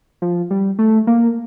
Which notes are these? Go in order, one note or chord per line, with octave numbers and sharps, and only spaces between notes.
F3
G3
A3
A#3